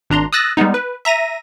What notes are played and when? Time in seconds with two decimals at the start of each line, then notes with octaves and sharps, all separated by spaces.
0.10 G#1 D4 A#5 C6
0.33 D#6 E6 F#6 A6 A#6
0.57 G3 G#3 B3 D#4
0.74 B4
1.05 E5 A#5 A#6 D#7